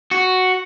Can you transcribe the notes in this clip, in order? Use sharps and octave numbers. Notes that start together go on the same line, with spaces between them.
F#4